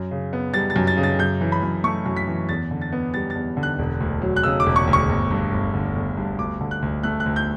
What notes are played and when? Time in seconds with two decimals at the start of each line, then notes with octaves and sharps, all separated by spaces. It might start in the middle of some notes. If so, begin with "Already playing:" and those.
Already playing: F#2
0.11 C#3
0.33 B3
0.54 G3 A6
0.70 A6
0.76 F#2
0.87 A6
0.97 C#3
1.03 A6
1.19 F#2 G6
1.41 E3
1.52 B5
1.63 F#2
1.84 A3 C#6
2.06 F#2
2.17 B6
2.27 E3
2.49 E2 A6
2.71 D3
2.81 A6
2.93 B3
3.14 G3 A6
3.30 A6
3.35 E2
3.57 D3
3.63 F#6
3.79 E1
4.00 D2
4.22 F#3
4.36 F#6
4.43 C#3 E6
4.60 D6
4.66 E1
4.76 C#6
4.87 D2
4.93 C#6
5.09 G1
5.31 G2
5.52 G1
5.74 D3
5.95 G1
6.17 G2
6.38 D2 D6
6.61 D3
6.71 F#6
6.82 D2
7.03 A3 F#6
7.20 F#6
7.26 D2
7.36 G6